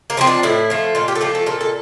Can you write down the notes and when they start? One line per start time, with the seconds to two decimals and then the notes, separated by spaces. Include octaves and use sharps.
0.10 A#3
0.17 F3 A3 C4
0.27 D4
0.43 A2 E4
0.70 F3 A3
0.95 A#2 F4
1.08 G4
1.15 A4
1.21 F3 A3 G4
1.35 A4
1.46 A#2 A4
1.61 A4